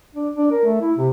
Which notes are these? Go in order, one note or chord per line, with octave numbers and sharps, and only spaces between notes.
D4
D4
A#4
A3
E4
C3